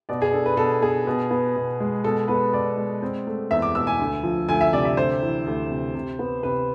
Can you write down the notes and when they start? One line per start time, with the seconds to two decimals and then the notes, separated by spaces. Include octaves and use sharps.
0.09 B2 D5
0.22 G#4
0.33 D4 A4
0.46 B4
0.57 B2 A4
0.82 B3 G#4
1.07 B2
1.31 B3
1.56 B2
1.80 G#3
2.04 B2 A4
2.28 B3 B4
2.53 B2 D5
2.77 G#3
3.02 C4
3.27 A3
3.51 E2 E5
3.62 D6
3.75 B2 E6
3.87 G#5
4.00 D2
4.23 F3
4.49 D2 G#5
4.61 E5
4.72 C3 D5
4.85 E5
4.97 D2 C5
5.22 E3
5.46 D2
5.70 C3
5.95 C3
6.19 B3
6.43 C3 B4